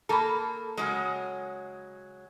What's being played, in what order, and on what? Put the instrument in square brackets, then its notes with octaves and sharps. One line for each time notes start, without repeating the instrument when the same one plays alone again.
[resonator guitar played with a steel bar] A#3 A4 [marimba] A#5 B5
[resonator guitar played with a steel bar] C#3 F#3 G#3